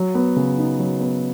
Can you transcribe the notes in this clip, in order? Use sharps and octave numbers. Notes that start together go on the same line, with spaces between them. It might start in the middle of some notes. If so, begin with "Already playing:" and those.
Already playing: F#3
B3
C#3
D#4
F#3
B3